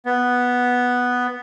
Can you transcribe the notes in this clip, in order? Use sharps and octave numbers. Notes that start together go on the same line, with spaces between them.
B3